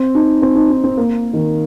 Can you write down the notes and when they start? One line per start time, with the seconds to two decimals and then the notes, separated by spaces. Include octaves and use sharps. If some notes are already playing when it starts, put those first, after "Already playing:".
Already playing: C4
0.15 D#4
0.42 C4
0.55 D#4
0.70 D#4
0.84 C4
0.97 A#3
1.33 D#3